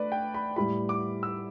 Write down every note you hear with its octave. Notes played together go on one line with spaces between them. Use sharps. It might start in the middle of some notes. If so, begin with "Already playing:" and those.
Already playing: A3 D4 B4 D5
G5
B5
A2 G3 E4 B5
D6
E6